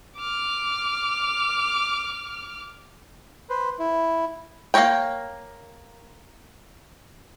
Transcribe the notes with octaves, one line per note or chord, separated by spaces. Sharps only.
D6 F6
B4 C5
E4
A#3 A4 A#4 C#5 G5